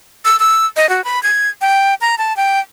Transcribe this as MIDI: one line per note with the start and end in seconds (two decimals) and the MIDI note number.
0.25 0.39 88
0.40 0.66 88
0.76 0.89 75
0.89 1.04 66
1.04 1.22 83
1.23 1.49 92
1.61 1.95 79
2.01 2.18 82
2.18 2.36 81
2.37 2.60 79